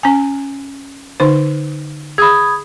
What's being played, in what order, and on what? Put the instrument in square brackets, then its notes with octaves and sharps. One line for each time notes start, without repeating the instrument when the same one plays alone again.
[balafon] C#4 G#5
D3 D#4 C5
[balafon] G#4 [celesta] B5 D#6 G#6